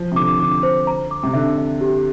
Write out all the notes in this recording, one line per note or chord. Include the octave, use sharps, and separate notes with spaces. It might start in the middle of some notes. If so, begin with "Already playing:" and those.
Already playing: F3
C3
D3 D6
D3 D6
C5
A#5
D6
C3
D3 E5
E5
G4